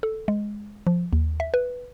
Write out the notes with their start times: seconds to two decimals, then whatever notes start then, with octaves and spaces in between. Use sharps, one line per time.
0.03 A4
0.28 G#3
0.87 F3
1.13 D#2
1.40 E5
1.54 B4